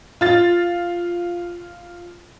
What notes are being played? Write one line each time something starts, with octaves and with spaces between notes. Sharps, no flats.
F4 A6